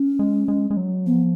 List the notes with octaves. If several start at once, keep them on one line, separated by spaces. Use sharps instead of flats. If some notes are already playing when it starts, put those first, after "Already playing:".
Already playing: C#4
G#3
G#3
G#3
F#3
F3 B3